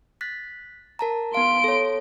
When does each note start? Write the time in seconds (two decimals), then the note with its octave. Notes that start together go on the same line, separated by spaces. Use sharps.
0.21 F#6 A6 B6
0.99 A#4 A5 A#5
1.34 B3 F5 C6 D7
1.64 A4 C#5